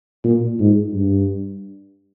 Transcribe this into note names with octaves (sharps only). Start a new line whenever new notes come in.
A#2
G#2
G2